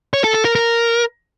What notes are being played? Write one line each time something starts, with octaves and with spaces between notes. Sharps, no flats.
C#5
A4
A4
A#4
A#4